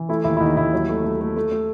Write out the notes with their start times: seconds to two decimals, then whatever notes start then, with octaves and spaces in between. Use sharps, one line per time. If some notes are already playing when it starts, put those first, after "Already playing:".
Already playing: E3
0.09 A3 E4
0.24 D#2 E4
0.37 E4
0.40 D#2 D#4
0.57 D#2 E4
0.73 F#3
0.89 A3
1.04 A3
1.21 A3
1.37 A3
1.52 A3